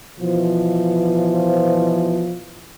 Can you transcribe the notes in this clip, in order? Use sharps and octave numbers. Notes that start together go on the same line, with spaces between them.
B2 E3 F3